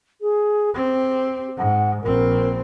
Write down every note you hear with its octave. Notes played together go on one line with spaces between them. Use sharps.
G#4
C4 G4
G#2 F#5
A#1 C4 A#4